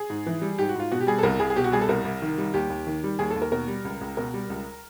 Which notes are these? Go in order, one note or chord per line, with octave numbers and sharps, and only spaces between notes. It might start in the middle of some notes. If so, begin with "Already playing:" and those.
Already playing: G#4
G#2
E3
G3
G#2 G4
F#4
G#2 F4
B2 F#4
G4
G3 G#4
A4
C2 A#4
C2 G#4
G#4
B2 G4
F#4
G3 G#4
A4
C2 A#4
C2
D#3
G3
D#2 G4
D#2
D#3
G3
D#2 G#4
A4
D#2
A#4
B2 A#4
G3
C#2
C#2
B2 A#4
G3
C#2